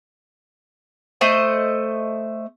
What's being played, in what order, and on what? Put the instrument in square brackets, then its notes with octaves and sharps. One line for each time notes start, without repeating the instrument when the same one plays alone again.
[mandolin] A3 C5 D#5